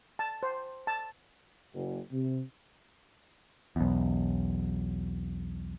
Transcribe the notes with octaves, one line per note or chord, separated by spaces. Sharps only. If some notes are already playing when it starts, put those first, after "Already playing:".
A5
C5
A5
F#1
C3
B1 E2